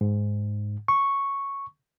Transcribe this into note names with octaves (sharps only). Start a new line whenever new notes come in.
G#2
C#6